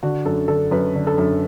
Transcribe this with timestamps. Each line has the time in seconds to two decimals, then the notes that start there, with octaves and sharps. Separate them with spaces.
0.03 D3 F#4
0.25 F#2 A4
0.48 D3 A4
0.71 F#2 B4
0.95 D3
1.07 A4
1.18 F#2